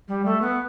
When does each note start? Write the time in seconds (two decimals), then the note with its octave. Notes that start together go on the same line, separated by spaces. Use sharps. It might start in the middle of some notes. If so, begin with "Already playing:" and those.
0.08 G3
0.25 A3
0.41 B3